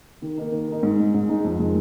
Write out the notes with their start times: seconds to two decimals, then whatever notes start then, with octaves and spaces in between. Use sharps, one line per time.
0.22 D#3
0.37 A#3 D#4
0.52 D#3
0.68 A#3 D#4
0.83 G#2
0.99 G#3 D#4
1.14 G#2
1.29 G#3 D#4
1.45 F2
1.59 D#3 G#3